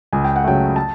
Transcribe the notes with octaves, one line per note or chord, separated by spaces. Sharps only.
C#2 G#5
G5
F#5
C#3 F#3 A3 G5
A5